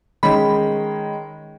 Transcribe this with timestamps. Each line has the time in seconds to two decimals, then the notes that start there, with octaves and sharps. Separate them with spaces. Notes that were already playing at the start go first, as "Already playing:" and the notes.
0.23 D#3 G#3 C#4 B5